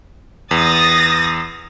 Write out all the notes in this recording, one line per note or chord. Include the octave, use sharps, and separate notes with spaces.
E2 D#6 A6 A#6